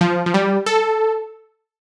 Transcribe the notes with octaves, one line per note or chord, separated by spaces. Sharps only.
F3
F3
G3
A4